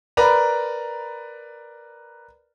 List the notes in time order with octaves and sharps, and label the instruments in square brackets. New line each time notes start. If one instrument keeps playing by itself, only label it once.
[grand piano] A#4 B4 D5 A#5